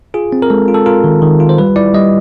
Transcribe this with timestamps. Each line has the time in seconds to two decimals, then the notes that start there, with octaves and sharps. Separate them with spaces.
0.14 F4 G#4
0.32 C4
0.42 A#4
0.50 G#3 A4
0.68 F4
0.74 A4
0.86 F4 A#4
1.04 D#3
1.22 D#3
1.40 F4
1.49 C5
1.58 G3 B4
1.76 E4 D5
1.94 G3 D#5